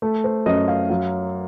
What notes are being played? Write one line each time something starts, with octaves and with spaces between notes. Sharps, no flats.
A3
C5
F#2 D#5
F5
F#3 F5